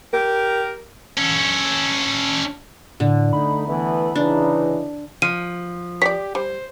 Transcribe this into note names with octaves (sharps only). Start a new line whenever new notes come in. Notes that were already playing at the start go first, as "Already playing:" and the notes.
G4 A#4
C#4 A4
A2 D3
A3 D#4 B5
E3 A3 B3
C#3 E3 D4 D#4
F3 D#7
G4 C#5 D5 B6
G3 C5